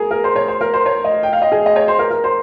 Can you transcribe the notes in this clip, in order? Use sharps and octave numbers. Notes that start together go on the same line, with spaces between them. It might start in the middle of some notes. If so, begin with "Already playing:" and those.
Already playing: G#4 A#4
A#4
C5
C#5
C5
A#4
C5
C#5
D#5
G5
F5
D#5
G#4
D#5
C#5
C5
A#4
A#4
C5